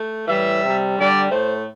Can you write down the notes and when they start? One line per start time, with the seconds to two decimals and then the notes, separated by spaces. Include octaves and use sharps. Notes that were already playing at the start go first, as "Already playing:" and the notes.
Already playing: A3
0.28 A2 E3 G3 E5
0.62 C3 G3
0.96 D3 G3 D5
1.30 A2 A3 C5